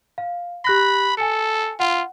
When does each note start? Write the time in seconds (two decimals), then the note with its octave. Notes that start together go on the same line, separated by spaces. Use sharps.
0.18 F5
0.65 G4 B5 F#6 A#6
1.17 A4 G#5 C#7
1.80 F4 F#5